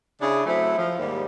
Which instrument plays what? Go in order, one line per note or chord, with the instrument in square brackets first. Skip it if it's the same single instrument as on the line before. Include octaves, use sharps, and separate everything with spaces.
[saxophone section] C#3 D4 E4 G#4
F#3 A3 C4 E4
F3
D#2 G#2 G3